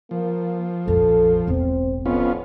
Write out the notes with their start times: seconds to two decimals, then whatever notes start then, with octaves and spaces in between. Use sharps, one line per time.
0.11 F3 A#3
0.88 A#1 F2 A4
1.47 E1 A1 C4
2.06 F2 B3 C#4 F4